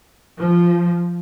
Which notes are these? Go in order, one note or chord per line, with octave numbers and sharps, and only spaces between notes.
F3